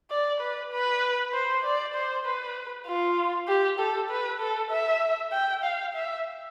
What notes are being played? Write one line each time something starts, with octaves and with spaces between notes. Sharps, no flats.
D5
B4
B4
C5
D5
C5
B4
F4
G4
A4
B4
A4
E5
G5
F5
E5